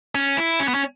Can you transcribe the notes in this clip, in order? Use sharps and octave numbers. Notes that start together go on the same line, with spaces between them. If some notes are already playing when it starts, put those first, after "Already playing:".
C#4
E4
C#4
B3
C#4